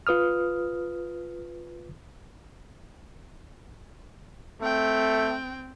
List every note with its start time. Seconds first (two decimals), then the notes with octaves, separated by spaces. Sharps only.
0.07 F4 B4 D#6 F6
4.61 A3 C4 G5